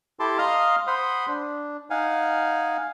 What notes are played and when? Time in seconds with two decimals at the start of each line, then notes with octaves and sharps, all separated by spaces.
0.20 E4 G4 A4 A5 C6 D6
0.38 D#5 F5 A#5 C6 D#6 F6
0.87 C5 F#5 B5 C6 D#6
1.27 D4
1.90 D#4 F5 F#5 G#5